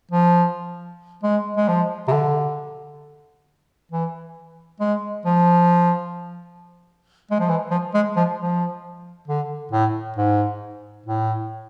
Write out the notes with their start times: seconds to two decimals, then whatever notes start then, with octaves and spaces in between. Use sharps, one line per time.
0.11 F3
1.23 G#3
1.57 G#3
1.68 F3
2.07 C3
2.12 D3
3.92 E3
4.80 G#3
5.25 F3
7.31 G#3
7.39 F3
7.49 E3
7.71 F3
7.94 G#3
8.16 F3
8.38 F3
9.28 D3
9.71 A2
10.16 G#2
11.06 A2